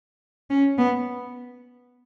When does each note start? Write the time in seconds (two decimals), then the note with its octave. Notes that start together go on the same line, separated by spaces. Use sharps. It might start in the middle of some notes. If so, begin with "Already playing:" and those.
0.50 C#4
0.78 B3